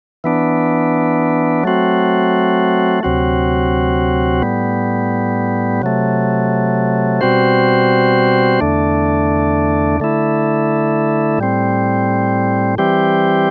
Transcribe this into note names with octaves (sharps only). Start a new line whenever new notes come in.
E3 B3 D4
F#3 A3 C4 F#4
D2 C3 F#3 C4 F#4
A2 G3 B3
C3 F#3 A3
B2 G3 C4 F#4 C5
E2 D3 A3 D4
D3 A3 E4
A2 G3 C4
E3 G3 C4 G4